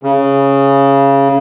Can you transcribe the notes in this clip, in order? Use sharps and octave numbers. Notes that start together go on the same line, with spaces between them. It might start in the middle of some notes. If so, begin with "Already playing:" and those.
C#3